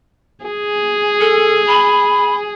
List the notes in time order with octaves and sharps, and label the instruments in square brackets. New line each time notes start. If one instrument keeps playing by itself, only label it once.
[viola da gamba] G#4
[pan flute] A4
B5